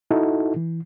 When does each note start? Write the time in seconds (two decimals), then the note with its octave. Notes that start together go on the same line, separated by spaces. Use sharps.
0.11 D#4 E4 F#4 A4
0.56 E3